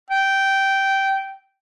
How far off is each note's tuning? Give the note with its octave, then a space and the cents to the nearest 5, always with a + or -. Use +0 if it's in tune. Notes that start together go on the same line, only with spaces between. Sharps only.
G5 -10